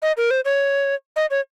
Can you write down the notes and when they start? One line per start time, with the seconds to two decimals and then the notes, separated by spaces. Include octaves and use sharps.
0.02 D#5
0.17 A#4
0.31 C5
0.45 C#5
1.16 D#5
1.31 C#5